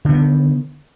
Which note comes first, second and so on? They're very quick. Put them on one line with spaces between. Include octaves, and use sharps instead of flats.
D3 B3 D#3